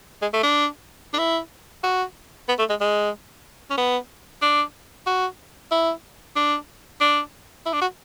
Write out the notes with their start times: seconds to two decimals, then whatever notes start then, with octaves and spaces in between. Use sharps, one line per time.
0.22 G#3
0.33 A3
0.43 D4
1.14 D4
1.19 E4
1.84 F#4
2.49 B3
2.59 A3
2.70 G#3
2.81 G#3
3.70 C#4
3.78 B3
4.42 D4
5.07 F#4
5.72 E4
6.36 D4
7.01 D4
7.66 E4
7.73 D4
7.81 F#4